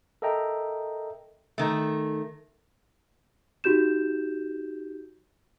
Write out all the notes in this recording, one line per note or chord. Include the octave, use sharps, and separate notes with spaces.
A4 A#4 D#5 E5 G5 A#5
D#3 A3
D#4 F#4 G4 G6 E7